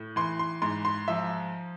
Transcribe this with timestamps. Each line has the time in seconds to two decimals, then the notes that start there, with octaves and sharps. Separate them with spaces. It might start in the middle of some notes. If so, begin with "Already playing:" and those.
Already playing: A2
0.16 E3 C6
0.39 C6
0.62 G#2 C6
0.85 C6
1.08 F3 E5